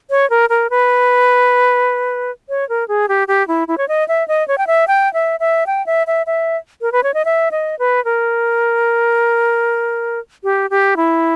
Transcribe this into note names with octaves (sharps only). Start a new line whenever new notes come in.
C#5
A#4
A#4
B4
C#5
A#4
G#4
G4
G4
E4
E4
C#5
D#5
E5
D#5
C#5
G5
E5
G5
E5
E5
G5
E5
E5
E5
A#4
B4
C#5
D#5
E5
D#5
B4
A#4
G4
G4
E4